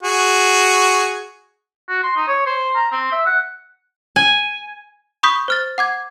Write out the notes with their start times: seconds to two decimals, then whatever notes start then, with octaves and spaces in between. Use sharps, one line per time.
0.03 F#4 G#4
1.89 F#4
2.03 C6
2.16 D#4
2.28 C#5
2.46 C5
2.75 A#5
2.92 C4
3.12 E5
3.26 F#5
4.16 G#5
5.23 B5 C#6 D#6 G6 B6
5.48 C5 F6 A6
5.78 F#5 D6 G#6